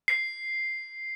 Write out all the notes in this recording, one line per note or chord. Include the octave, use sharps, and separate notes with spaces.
C7